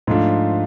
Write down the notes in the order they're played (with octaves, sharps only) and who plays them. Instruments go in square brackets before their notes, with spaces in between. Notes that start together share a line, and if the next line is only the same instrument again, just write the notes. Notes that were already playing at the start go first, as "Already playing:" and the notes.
[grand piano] G#2 F3 A3 D4 F4